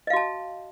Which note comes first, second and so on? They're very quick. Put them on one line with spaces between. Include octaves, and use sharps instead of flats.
D#5 F5 F#4 A5